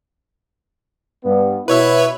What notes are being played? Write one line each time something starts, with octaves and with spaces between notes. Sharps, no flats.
G2 B3
B2 E4 B4 C#5 E5